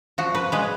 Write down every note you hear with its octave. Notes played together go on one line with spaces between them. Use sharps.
F3 F#4
B4
G#3 B4